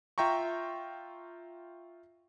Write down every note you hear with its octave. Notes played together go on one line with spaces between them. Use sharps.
F4 E5 G5 A#5 C#6